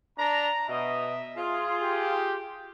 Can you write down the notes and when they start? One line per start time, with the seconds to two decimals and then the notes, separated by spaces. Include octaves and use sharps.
0.18 D4 A#5
0.69 B2 D#5 E5
1.36 F4 G#4
1.82 G4